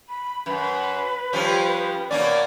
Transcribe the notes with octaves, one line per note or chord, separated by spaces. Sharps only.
B5
F#2 B4
F3 G3 C#4
B2 A#3 C#4 D5